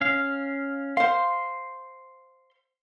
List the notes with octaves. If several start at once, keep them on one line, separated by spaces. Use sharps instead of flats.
C#4 F5
C5 F5 C6